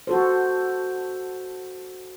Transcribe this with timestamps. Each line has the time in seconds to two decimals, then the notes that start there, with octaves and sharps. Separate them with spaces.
0.07 F#4 A4 C5